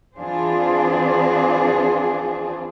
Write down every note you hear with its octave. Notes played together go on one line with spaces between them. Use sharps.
E3 C4 D4 F4 G#4 C5